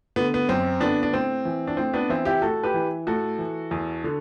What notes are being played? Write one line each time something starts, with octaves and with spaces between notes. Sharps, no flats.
D3 B3
B3
F#2 C4
D3 B3 D4
D4
A2 C4
E3
D4
A2 C4
B3 D4
E3 C4 E4
E4 G4
A2 F#4 A4
G4 B4
E3
A2 F#4 A4
E3
E2
D3